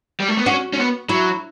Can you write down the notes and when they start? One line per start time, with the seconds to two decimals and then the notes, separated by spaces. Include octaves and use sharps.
0.20 G3
0.28 A3
0.37 B3
0.46 C#4 F#4
0.73 C#4
0.78 B3
1.09 F#3 E4